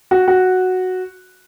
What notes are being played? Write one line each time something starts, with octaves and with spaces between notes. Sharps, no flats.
F#4
F#4